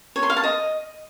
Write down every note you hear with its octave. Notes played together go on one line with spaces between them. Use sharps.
C#5
C6
F5
A5
D#5